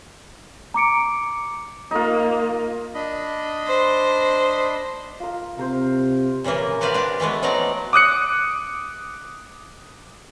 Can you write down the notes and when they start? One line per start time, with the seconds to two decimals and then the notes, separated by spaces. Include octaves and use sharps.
0.74 A#5 D6 C#7 D7
1.91 A#3 D#4 F4
2.94 D4 D#5 B5
3.67 C5
5.20 F4 A#4
5.59 C3 A#4 C5 F5
6.44 A#2 C#3 E3 A#3
6.81 F#4 G4 B4 C5 D5 F5
6.94 D4 F4 G4
7.20 E3 G#3 A3 B3
7.43 F3 F#3 B3 D#4 D5 A#5
7.93 D6 D#6 F#6 C#7